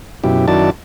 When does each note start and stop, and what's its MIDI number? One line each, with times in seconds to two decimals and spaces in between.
0.24 0.46 42
0.24 0.46 47
0.24 0.46 64
0.24 0.46 67
0.48 0.70 42
0.48 0.70 51
0.48 0.70 64
0.48 0.70 66
0.48 0.70 74
0.48 0.70 81